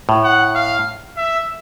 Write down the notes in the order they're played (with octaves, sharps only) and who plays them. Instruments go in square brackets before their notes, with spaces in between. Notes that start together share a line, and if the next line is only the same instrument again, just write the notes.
[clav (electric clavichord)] A2
[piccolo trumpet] F#5
F5
E5